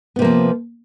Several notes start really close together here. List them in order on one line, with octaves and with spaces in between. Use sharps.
B3 C3 A#3 F3